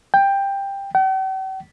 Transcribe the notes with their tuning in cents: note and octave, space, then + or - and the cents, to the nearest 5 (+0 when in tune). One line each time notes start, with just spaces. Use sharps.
G5 +15
G5 -45